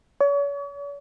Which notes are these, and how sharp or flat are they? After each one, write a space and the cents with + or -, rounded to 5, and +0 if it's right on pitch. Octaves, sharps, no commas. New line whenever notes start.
C#5 +40